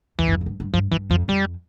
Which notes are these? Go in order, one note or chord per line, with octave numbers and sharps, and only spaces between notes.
E2 E3
G2
F2
A2
G2
G2
G2 F3
G2 E3
F2 F3
F2 G3